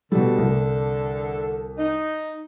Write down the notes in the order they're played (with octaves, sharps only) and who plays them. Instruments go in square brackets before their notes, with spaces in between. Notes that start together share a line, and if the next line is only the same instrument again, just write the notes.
[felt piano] B2 G3 [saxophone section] D3 A4
[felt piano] C2
[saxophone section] D#4